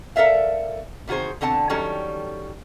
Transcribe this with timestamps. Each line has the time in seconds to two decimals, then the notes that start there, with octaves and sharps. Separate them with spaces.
0.16 A4 A#4 D5 E5 F5
1.08 C3 D#3 F#4 G#4 C5
1.41 B2 D3 C4 F#5 A5
1.69 D#3 F#3 G3 C#4 A4